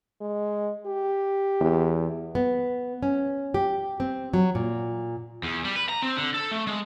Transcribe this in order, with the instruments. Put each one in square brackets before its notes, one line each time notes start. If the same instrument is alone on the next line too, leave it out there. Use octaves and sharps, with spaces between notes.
[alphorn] G#3
G4
[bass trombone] E2
[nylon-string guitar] B3
C#4
G4
C4
F#3
A#2
[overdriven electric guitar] E2
G3
B4
A#5
C4
D3
A4
A3
G#3